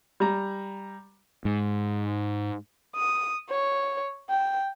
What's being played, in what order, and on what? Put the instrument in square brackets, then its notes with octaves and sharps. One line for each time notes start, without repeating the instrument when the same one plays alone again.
[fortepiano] G3 A#5
[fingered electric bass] G#2
[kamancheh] D#6
C#5
G5